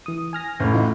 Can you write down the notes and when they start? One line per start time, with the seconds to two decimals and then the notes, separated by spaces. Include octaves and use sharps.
0.06 E3 D#6
0.33 G#5 F6 A#6
0.60 A1 A2
0.73 E3 D#4 F4